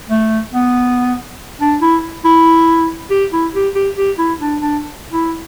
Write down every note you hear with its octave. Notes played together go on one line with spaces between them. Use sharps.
A3
B3
D4
E4
E4
G4
E4
G4
G4
G4
E4
D4
D4
E4